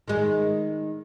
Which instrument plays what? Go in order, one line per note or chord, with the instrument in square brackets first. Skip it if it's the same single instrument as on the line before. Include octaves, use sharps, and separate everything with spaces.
[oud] D#3 G#3